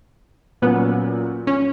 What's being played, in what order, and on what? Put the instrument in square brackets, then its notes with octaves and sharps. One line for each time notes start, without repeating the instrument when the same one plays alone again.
[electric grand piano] A#2 F#3 C#4 [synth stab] B3
[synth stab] C#4